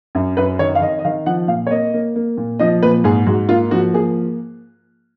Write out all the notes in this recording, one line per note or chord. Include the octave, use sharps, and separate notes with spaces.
F#2
F#2 B4
D#3 C#5
F5
D#3 D#5
D#5
D#3 F5
F3 F#5
A#2 F5
C#5
A#3 D#5
A#3
A#3
A#2
F3 D#5
A#2 B4
G#2 G#4
G#2 F#4
A#3 F4
F3 F#4
A#3 G#4